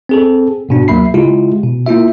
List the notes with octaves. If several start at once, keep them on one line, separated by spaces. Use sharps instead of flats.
C4 G#4 A4
G#2 B2 D4 F#4
D2 F#3 A#3 E5 B5 C7
C#3 G#3 E4 F4 G4
B2
A#3 E4 F4 E5